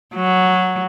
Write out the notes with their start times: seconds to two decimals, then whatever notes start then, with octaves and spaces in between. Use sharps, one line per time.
0.15 F#3